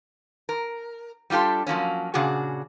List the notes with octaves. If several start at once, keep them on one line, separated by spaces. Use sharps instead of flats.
A#4
G3 D4 F4 G4 A4
F3 F#3 A#3 C#4
A#2 C#3 D4 F#4 G#4